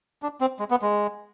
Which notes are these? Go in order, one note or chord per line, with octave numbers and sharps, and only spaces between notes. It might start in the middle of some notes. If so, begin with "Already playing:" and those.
D4
C4
G#3
B3
G#3